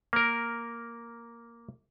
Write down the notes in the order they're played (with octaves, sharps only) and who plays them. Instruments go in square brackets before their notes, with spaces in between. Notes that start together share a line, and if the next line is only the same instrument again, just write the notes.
[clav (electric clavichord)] A#3 A#4